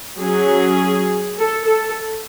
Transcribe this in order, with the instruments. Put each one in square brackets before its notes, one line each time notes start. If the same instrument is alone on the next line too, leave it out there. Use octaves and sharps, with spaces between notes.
[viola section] F#3 C#4 G#4
A4
A4